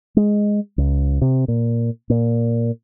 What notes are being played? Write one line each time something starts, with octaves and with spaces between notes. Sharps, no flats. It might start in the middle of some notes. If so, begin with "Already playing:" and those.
G#3
C#2
C3
A#2
A#2